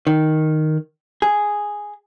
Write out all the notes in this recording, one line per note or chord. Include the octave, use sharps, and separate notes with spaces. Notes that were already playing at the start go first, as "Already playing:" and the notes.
D#3
G#4